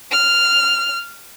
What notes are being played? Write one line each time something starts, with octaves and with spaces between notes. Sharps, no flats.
F6